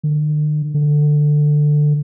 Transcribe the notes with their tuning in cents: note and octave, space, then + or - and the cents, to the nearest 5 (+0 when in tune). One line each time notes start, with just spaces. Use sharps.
D3 +45
D3 +15